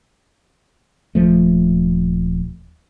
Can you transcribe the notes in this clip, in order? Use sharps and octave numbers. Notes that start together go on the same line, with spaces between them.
D#1 F3 A3